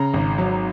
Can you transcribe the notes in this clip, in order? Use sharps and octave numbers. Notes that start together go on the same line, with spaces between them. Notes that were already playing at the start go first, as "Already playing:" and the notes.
Already playing: C#3 A#5
G#1
F#3